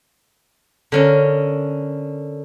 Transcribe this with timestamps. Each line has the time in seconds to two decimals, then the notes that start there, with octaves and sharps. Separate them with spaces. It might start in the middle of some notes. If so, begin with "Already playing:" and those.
0.92 D3 C#4 A#4